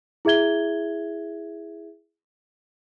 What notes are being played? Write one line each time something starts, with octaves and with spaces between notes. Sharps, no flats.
E4 G#4 E5 G#6 G7